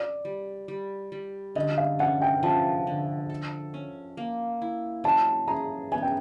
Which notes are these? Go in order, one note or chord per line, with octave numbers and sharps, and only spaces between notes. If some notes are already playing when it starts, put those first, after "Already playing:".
Already playing: D5
G3
G3
G3
D3 D#5
F5
C#4 F#5
G5
F3 A5
D3
A4
C#4
A#3
E4
F#3 A5
G#4 A#5
B3 G#5
G5